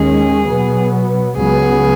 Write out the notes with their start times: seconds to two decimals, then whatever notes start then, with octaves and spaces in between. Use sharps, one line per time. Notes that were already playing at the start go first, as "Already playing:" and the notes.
Already playing: D#2 D#3 G#3 C#4 G#4
0.46 B2 F#3 B3
1.37 C#2 C#3 F#3 B3 G#4